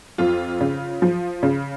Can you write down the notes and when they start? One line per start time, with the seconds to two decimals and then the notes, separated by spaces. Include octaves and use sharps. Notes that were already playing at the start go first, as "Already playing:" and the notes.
0.18 F2 F4
0.61 C#3
1.02 F3
1.43 C#3